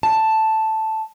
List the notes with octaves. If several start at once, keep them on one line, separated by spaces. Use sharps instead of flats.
A5